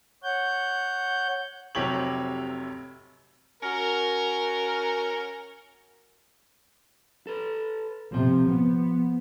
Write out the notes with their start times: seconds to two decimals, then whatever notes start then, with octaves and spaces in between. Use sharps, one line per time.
0.24 C#5 F#5 G6
1.75 F1 C3 F#3 G4 C#5 F#7
3.62 C#4 F#4 A#4
7.27 A4 B4
8.12 C3 F3 C5
8.48 B3